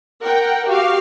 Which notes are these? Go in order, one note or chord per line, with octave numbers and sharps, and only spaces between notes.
A#4 F#5 G5
F#4 G4 F5